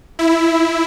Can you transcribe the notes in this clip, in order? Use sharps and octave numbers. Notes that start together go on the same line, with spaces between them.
E4